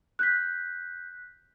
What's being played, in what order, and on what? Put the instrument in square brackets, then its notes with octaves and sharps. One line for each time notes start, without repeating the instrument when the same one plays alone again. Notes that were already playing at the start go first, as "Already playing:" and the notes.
[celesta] F#6 G6 B6